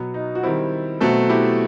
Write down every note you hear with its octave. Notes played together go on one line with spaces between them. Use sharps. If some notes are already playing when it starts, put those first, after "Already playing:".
Already playing: B2 F#3 B3
D#4
F#4
D#3 G3 C4 E4
B2 F#3 A3 C4 F#4 A4
E4 G4